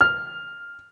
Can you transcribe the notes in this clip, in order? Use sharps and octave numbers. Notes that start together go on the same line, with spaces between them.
F6